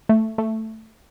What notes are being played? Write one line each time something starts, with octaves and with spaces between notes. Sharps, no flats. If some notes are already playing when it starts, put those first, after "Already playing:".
A3
A3